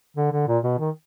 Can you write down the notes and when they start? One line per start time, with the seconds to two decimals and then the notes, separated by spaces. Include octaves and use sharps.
0.17 D3
0.32 D3
0.47 A#2
0.64 B2
0.79 D#3